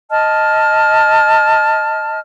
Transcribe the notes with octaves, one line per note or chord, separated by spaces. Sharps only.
D#5 A5 F6